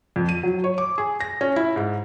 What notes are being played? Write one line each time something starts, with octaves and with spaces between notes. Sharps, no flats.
F2
D#7
F#3
C#5
D6
G#4
A#6
C#4
E4
G#2